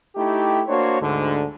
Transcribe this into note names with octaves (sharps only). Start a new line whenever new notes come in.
A3 D#4 E4 G4
A#3 D4 F#4 C5 C#5
D2 G#2 D3